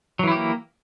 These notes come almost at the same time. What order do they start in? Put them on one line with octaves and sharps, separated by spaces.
F#3 E3 E4 G4 A#3